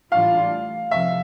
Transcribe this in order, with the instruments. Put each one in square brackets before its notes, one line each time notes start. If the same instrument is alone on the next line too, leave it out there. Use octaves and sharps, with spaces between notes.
[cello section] A2 E3 G3 D4 F4 [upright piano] F5
[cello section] F2 C3 F3 [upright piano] E5